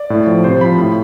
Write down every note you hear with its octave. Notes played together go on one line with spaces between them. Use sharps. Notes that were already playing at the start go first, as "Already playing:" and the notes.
Already playing: D5
A2
F3
C3 C5
F3 B5
A2